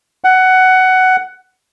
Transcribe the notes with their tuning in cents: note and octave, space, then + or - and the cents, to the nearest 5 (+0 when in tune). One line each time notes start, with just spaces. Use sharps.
F#5 +15